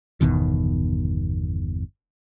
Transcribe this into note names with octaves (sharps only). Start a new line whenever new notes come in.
G1 E2 B2 D#3